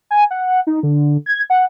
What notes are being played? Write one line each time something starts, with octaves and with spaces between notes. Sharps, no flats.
G#5
F#5
D#4
D3
G#6
F#5